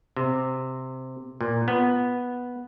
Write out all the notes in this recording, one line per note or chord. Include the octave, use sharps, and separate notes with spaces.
C3
A#2
B3